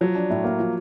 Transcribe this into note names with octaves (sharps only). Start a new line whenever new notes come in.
F3 F#3
D4
A2
A#3
F3